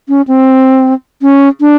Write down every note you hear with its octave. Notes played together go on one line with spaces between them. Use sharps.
C#4
C4
C#4
D4